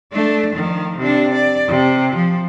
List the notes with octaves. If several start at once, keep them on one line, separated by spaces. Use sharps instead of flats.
A3 D4
D#3 F3
C3 D4
D5
C3
F3